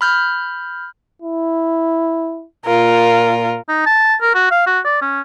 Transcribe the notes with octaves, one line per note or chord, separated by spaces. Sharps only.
B5 F6 G6
E4
A#2 F4 A#4
D#4
A5
A#4
F#4
F5
F#4
D5
C#4